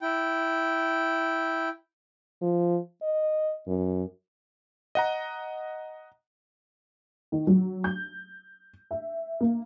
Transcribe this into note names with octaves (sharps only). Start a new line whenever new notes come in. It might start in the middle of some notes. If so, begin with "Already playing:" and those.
E4 G5
F3
D#5
F#2
D#5 F#5 A#5
D#3
F#3
G6
E5
A#3